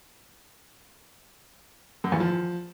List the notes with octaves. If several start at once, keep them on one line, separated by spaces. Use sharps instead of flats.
F#2
E2
F3